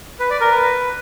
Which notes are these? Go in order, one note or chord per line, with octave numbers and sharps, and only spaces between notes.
B4
D5
A#4
B4